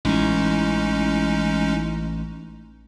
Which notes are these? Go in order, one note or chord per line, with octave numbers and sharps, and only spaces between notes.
A1 E3 G#3 C#4 D#4